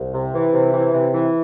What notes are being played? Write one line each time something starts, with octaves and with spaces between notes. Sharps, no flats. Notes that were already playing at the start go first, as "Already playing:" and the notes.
Already playing: C2
C3
E3
C3
E3
C3
E3